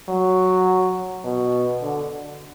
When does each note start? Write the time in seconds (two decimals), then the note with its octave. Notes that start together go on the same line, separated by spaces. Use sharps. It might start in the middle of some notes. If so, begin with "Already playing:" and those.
0.09 F#3
1.24 B2
1.81 D3